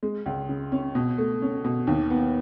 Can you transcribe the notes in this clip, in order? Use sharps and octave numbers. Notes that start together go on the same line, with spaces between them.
G#3
C#2
C#3
C#4
B2
A3
C#4
B2
D#2
B3